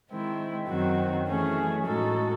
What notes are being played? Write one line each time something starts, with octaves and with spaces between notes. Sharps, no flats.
D#3 G#3 C4 E4
F#2 D#3 F#3 C4 F#4
E3 A3 C#4 G#4
A2 G#3 D#4 F#4 A4